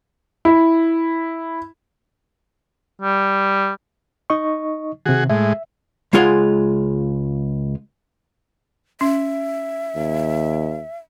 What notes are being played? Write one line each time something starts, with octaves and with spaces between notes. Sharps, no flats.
E4
G3
D#4 D#5 C#6
C3 D#3 F#4 G#4
A2 G#3 E5
C#2 G#3 F4 G#4 F#5 C6
C#4 E5
D#2